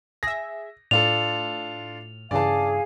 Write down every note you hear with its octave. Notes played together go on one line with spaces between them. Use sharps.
G#4 E5 A#6
A2 D4 F4 A4 F7
G2 C#3 E3 G#4 D5 F5 G#5 A5